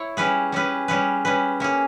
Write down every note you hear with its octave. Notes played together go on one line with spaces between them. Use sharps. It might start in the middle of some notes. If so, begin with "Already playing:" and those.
Already playing: E4 C#5
G3 C#4 G#4 B4
G3 C#4 G#4 B4
G3 C#4 G#4 B4
G3 C#4 G#4 B4
A#3 C#4 G#4